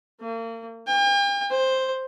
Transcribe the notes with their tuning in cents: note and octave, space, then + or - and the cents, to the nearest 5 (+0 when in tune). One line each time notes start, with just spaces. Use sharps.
A#3 -35
G5 +45
C5 +5